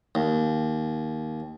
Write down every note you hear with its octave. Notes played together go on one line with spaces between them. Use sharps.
D#2